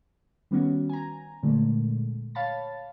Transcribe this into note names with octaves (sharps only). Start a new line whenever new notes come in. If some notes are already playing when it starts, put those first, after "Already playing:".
D#3 G3 B3 C#4 F#4
G#5 A#5
A#2 D3 G#3 A3
C#5 F5 A5 B5 A6